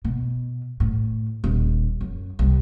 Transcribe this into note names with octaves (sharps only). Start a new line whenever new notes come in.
B2
A2
D#1
F#2
C2